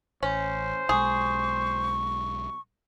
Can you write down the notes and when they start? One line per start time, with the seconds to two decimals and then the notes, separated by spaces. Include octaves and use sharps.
0.23 A1 C#4 C5
0.89 B1 G#3 G#4 C#6